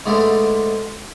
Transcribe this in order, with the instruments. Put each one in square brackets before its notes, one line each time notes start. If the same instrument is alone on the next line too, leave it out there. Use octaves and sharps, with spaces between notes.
[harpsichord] G#2 B2 D3 G#3 A3